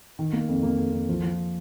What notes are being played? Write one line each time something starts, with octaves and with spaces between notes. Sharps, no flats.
D#3
A#3
F2
A#3
F2
F2
F3
F3